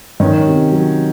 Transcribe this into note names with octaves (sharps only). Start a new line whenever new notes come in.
D#3 C#4
C3
F#3